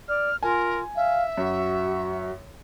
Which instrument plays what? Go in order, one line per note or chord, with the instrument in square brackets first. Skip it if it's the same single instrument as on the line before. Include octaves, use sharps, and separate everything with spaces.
[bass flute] D5 [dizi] F6
[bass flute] F4 [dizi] A#4 [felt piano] G#5
[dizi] E5 [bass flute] F5
[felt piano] F#2 [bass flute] F#4